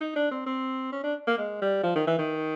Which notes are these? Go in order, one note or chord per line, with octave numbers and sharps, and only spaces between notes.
D#4
D4
C4
C4
C#4
D4
A#3
G#3
G3
F3
D#3
E3
D#3